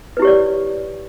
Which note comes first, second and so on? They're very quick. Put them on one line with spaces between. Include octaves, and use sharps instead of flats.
B4 E4 G4 C#5 D5